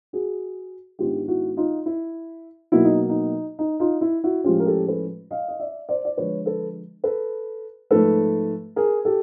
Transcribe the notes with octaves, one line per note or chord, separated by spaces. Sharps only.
F#4 G#4
G#2 D#3 G#3 B3 D4 F4 G4
E4 F#4
D#4 F4
E4
B2 F#3 A#3 D#4 E4
D#4
D#4
D#4
D#4 F4
E4
E4 F#4
A2 F3 G#3 C#4 F4 G4
A#4
G4 A4
A4 B4
D#5 F5
D#5
D5 E5
C5 D5
D5
D3 F3 G#3 B4 C#5
A4 B4
A4 B4
G#2 F3 A3 A4 B4
G#4 A#4
G4 A4